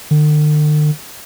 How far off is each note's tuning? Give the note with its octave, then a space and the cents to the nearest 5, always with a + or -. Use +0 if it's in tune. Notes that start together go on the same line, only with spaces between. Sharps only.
D3 +45